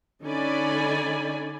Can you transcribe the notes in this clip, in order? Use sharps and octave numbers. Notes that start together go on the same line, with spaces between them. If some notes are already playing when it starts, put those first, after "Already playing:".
D3 C#4 D#4 D5 G#5 B5